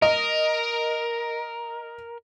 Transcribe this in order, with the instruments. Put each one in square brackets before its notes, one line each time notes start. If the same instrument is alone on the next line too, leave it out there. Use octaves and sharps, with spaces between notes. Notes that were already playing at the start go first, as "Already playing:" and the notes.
[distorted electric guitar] A#4 [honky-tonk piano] D#5